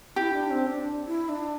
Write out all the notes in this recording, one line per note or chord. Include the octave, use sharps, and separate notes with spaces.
E4 G4
D4
C4
D4
E4
D4